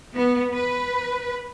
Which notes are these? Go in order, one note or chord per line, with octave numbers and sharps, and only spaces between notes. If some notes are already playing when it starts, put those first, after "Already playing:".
B3
B4